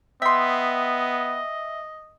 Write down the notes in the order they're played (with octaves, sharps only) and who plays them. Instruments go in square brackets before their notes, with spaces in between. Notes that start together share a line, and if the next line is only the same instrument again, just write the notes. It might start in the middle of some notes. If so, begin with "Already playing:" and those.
[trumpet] B3 [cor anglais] D#5 [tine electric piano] E5 [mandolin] G5 C6